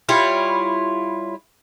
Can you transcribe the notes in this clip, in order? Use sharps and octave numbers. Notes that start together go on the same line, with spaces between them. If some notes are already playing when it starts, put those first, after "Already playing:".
G3 E4 F4 C#5